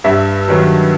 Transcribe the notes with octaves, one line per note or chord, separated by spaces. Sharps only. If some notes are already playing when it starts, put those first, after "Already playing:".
G2 E5
D#3 F#3 B3